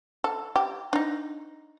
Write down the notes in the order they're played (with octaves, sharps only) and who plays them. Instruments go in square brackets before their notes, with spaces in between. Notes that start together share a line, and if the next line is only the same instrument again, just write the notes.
[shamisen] A4
G4
D4 D#4